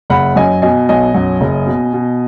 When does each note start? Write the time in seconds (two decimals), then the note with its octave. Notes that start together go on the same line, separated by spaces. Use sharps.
0.10 F#1 F#5 B5
0.36 F#2 D#5 G#5
0.62 B2 D#5 G#5
0.89 B1 D#5 G#5
1.15 F#2
1.41 F#1
1.67 B2
1.93 B2